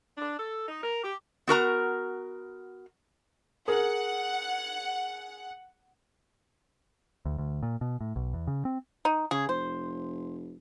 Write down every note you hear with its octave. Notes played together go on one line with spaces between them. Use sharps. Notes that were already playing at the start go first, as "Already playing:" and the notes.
D4
A4
D#4
A#4
G4
B3 F#4 A#4 A#5
G#4 A#4 F#5
D2
D2
A#2
B2
A2
B1
E2
C#3
C4
D#4
C#3 G#4
F1 C5